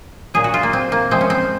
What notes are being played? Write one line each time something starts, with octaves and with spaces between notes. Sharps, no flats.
A#2 F#3 G#4
F#4
F4
A#3
C4
A#3
C3 F3 G#3 C4
C#4
C4